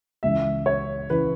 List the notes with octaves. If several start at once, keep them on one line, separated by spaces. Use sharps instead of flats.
C#2 C#3 E3 E5
C#5
C#3 E3 B4